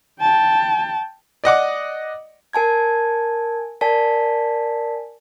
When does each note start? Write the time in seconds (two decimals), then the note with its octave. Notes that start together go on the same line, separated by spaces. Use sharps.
0.21 G5 A5
1.44 D5 D#5 F#5 D6
2.53 A#4 G#5 A5 G#6
3.81 A#4 D5 G#5 A5 B6